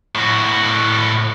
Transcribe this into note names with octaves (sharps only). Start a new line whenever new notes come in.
A2 F#4